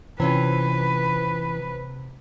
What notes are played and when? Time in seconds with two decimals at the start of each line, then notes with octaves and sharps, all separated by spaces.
0.20 C3 E3 C#4 F4 B4